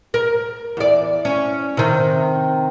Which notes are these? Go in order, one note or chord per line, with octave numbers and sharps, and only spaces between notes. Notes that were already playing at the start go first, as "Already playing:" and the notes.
A#4
E2 D5
C#4
C3 D#3